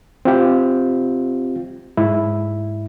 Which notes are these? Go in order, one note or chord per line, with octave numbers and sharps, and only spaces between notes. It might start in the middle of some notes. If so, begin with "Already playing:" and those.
C4 F4 G4
G#2 E4